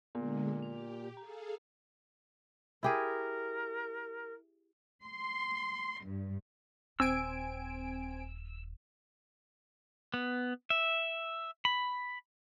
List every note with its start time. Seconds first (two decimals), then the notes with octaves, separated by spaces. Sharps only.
0.15 A#2 D3 G#3 B3
0.62 G4 F7
1.17 G#4 A4 F5 A#5
2.83 E4 G4 G#4 A#4
5.02 C6
6.02 G2
7.00 D#1 C4 G#5 E6 D7
10.14 B3
10.70 E5
11.65 B5